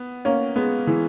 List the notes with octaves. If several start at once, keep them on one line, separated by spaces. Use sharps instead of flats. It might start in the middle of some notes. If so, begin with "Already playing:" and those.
Already playing: B3
A#3 C#4
G#3 B3
E3 G#3